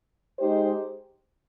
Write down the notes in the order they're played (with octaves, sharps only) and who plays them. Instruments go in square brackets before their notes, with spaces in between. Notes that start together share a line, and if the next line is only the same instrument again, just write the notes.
[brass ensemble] G#3 D#4 G4 C5